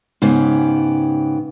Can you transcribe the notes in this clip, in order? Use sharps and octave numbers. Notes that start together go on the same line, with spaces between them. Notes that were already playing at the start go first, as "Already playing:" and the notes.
G#2 C#3 B3 G4